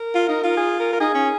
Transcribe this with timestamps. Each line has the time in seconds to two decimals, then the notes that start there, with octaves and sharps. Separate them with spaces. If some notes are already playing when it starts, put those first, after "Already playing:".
Already playing: A#4
0.15 F4
0.29 D#4
0.44 F4
0.57 G#4
0.80 A#4
0.93 A#4
1.01 D#4 G#4
1.15 C#4